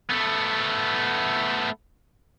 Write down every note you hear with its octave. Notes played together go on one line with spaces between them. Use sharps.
A3 B3